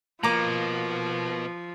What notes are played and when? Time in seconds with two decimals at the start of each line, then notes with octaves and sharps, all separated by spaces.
0.23 B2 F3 A#3 A#5 D6